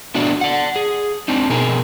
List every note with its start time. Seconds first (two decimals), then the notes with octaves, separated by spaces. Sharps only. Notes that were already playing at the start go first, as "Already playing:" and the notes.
0.15 A3 B3 D4 F#4 D5
0.41 D5 F#5
0.76 G#4
1.28 C4 D4 D#4
1.50 B2 G#4 A#4